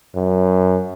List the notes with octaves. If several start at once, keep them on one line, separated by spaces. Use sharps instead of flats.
F#2